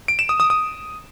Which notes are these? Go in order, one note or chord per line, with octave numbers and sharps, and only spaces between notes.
D7
E7
D#6
D#6
D#6